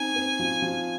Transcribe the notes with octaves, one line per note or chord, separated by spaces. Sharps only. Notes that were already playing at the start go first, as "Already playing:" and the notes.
Already playing: C4 D#4 G#5
C4
F3
F3